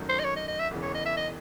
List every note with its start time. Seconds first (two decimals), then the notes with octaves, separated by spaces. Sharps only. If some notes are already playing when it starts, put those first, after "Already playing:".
Already playing: G#1 F#2 D#3 F#3 A3
0.09 C5
0.20 D#5
0.25 C#5
0.37 D#5
0.48 D#5
0.59 E5
0.71 E1 E2 C#3 E3
0.82 C#5
0.94 D#5
1.06 E5
1.17 D#5